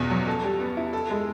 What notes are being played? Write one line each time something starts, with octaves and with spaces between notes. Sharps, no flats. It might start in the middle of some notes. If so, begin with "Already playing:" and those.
Already playing: E2 B2 B3
F#3
A4
G3
B3
E4
A4
G#3